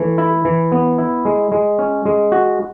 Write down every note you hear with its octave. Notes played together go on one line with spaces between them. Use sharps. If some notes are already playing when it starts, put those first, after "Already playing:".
Already playing: E3 A3
E4
E3
B3
E4
G#3
G#3
C#4
G#3
F#4